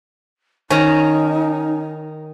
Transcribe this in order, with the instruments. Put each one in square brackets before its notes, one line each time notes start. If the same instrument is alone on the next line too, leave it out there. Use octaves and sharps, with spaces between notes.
[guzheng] D#3 A#5 [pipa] C#4 [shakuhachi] D#4